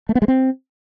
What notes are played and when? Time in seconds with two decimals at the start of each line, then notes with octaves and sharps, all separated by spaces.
0.09 A3
0.15 B3
0.22 G#3
0.28 C4